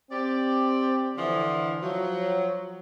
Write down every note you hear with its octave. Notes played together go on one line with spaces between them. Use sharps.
C4 G4 D5
D3 E3 F3
F3 F#3